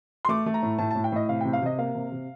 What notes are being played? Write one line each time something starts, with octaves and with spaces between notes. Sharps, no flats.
C6
A3 D6
A3
A#5
A2
A2 A5
A5
A2
G5
A2 D#5
C3 F5
G5
C3
F5
C3 D#5
A#3 F5
C3
C3